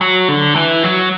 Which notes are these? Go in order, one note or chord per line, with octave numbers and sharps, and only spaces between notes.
F#3
D3
E3
F#3